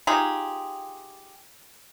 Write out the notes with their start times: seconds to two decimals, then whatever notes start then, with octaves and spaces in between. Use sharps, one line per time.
0.07 D#4 F4 G4 G#4